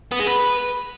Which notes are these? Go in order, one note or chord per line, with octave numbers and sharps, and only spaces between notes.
B3
G#3
B4